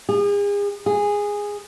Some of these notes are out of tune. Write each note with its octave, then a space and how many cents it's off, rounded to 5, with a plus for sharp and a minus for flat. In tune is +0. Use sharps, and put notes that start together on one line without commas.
G#4 -40
G#4 -15